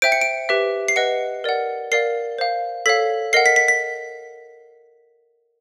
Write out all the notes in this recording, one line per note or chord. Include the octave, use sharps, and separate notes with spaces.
C5 E5 G5 D7
C#7
D7
G4 B4 E5
C7
B4 D#5 F#5 C#7
A#4 D5 F#5
A#4 D5 F5 C7
C5 F5
A4 C#5 F5 B6
A#4 D#5 F#5 C7
B6
B6
B6